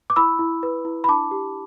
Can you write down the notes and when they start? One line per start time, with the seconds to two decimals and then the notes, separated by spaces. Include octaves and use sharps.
0.10 D6
0.16 E4 B5 E6
0.39 E4
0.63 B4
0.85 E4
1.04 B5
1.08 D4 A5 D6
1.31 G4